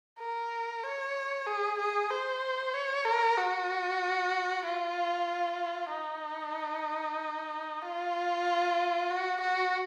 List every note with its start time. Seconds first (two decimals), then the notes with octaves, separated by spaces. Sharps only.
0.19 A#4
0.83 C#5
1.47 G#4
1.79 G#4
2.10 C5
2.74 C#5
3.05 A#4
3.37 F#4
4.65 F4
5.91 D#4
7.82 F4
9.10 F#4
9.41 F#4